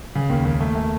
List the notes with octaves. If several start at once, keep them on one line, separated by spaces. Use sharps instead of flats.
C#3
D#2
D#2
A3
A3